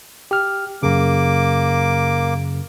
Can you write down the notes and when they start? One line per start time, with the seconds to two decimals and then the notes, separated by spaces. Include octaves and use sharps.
0.31 G4 F6
0.83 F#2 C#3 A#3 D6